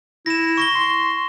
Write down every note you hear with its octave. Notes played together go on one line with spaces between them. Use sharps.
E4 A#6 E7
C#6 A#6 G7
C6